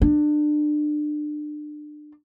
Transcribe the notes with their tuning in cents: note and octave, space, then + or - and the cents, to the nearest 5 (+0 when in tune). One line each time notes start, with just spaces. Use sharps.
D4 +30